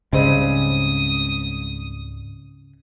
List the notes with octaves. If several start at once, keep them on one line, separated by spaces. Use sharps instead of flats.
C#2 G#2 C#3 G3 G#3 C4 D#6